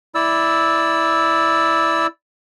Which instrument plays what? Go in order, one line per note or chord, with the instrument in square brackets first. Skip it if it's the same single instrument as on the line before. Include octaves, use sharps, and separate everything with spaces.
[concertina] E4 D5 E6